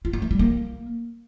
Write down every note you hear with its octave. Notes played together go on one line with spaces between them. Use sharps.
F4
C#4
A3
G3
A#3